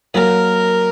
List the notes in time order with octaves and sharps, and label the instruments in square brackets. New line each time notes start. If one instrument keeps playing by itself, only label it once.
[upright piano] F#3 A#3 [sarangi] A#4